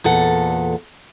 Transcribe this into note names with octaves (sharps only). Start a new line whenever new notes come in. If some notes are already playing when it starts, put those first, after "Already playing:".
E2 A#2 A4 F#5